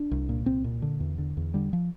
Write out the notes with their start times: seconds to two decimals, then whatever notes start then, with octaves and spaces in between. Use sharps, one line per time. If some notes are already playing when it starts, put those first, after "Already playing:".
Already playing: D4
0.11 C2
0.29 A#2
0.46 C2 C4
0.64 A#2
0.82 D3
1.00 E2
1.18 D3
1.37 E2
1.54 D3 G3
1.73 F3